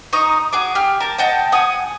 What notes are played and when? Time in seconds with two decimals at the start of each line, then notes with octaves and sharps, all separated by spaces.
0.13 D#4 A#5 C#6 D#6
0.53 F#4 G#4 D6
0.75 G4 F6
1.00 A#4 A5
1.18 D#5 F#5 G5 A5
1.52 F#5 G#5 D#6